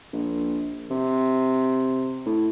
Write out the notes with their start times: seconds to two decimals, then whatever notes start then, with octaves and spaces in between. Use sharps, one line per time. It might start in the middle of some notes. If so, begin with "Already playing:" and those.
0.13 A#1
0.90 C3
2.26 A2